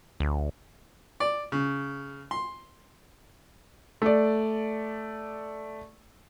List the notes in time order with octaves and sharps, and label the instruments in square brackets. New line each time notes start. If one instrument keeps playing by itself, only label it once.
[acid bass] D2
[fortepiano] D5
C#3
C6
[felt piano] A3 D5